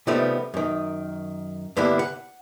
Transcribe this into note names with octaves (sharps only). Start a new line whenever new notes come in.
C3 D#3 F3 G3 A3 B3
F#2 D#3
G2 D3 A#3 B3 D4 E4
F#5